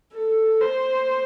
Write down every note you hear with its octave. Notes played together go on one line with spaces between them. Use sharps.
A4
C5